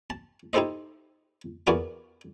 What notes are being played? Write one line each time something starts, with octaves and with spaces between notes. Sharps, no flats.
A5
D#4 E4 G4 A4 C5 D#5
E2 B3 F#4 A#4 D5 G#5